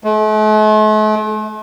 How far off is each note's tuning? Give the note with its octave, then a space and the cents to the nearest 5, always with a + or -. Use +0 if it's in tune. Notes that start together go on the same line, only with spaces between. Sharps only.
A3 -45